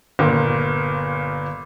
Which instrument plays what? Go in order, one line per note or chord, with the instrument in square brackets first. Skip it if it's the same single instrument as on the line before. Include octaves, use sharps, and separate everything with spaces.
[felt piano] G1 A#2 A#4